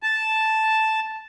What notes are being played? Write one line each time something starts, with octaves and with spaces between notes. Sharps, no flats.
A5